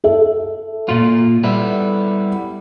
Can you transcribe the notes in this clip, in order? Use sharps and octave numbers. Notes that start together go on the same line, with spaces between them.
A4 E5
A#2 F4
G3 B3 E4